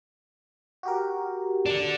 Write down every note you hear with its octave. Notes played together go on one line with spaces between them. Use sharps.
F#4 G4 A#4
D3 D4